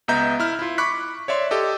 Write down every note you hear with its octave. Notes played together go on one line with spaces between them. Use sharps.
C#2 B3 D#5 E5 A#5 G6
E4 F6
E4 F4
B5 C#6 D6 F#6 B6
C#5 D5 E5 C6
G4 A4 D#5